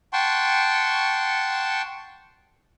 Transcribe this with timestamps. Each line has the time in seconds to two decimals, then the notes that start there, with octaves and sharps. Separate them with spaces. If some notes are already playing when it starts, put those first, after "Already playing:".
0.13 F#5 G5 A5 C6 C#6